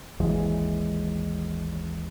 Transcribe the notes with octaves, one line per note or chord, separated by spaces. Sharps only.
G#1 D#2 E3 G#3